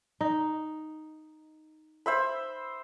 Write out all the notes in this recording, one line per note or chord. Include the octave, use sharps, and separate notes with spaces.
D#4
C5 E5 B5